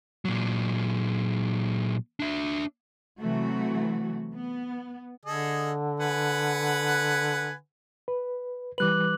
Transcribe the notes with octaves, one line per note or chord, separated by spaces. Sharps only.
A#2 F#3
D4 E5
C3 E3 F#3 A3 F#4
B3
D3 G#4 A4 D#5
B4 F#5 G#5
B4
E3 G3 B4 D6 F#6 F#7